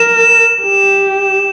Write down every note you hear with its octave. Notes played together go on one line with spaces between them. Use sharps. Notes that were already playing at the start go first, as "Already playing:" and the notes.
Already playing: A#4 E7
G4